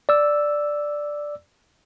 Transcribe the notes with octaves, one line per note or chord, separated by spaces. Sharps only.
D5 E6